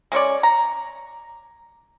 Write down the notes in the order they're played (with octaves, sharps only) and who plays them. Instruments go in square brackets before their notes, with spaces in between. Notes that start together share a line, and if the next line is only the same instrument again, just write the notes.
[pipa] G#3 C#4 C#5 D5
A#5